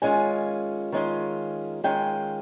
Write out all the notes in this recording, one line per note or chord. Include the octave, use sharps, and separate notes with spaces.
D#3 G#3 C#4 F4 G#5
D#3 G#3 C#4 F4
D#3 G#3 C#4 F4 G5